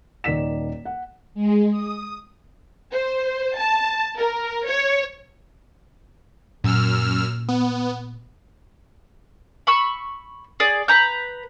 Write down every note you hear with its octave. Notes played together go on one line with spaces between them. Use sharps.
D#1 D#3 D5 B6 E7
F#5
G#3
D#6
C5
A5
A#4
C#5
F#2 A#2 E6 F6
B3
B5 C#6 E6
G#4 D5
B4 A#5 G6